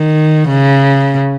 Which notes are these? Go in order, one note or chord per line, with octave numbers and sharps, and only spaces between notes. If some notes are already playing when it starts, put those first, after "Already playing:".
Already playing: D#3
C#3